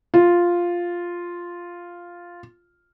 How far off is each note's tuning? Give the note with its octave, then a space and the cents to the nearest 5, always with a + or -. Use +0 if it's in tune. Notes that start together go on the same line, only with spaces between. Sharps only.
F4 +0